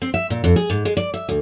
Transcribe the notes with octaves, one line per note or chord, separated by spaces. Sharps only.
C4
E5
A#2
F2
G#4
G#2
G#3
D5
E5
D2